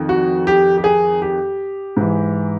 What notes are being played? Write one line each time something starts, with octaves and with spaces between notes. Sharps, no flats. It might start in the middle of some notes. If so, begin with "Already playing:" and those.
Already playing: F2 D#3
F#4
G4
G4
G#4
G4
G#2 E3